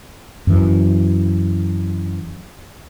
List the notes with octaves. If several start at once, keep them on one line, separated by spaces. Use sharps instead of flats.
F#2 E3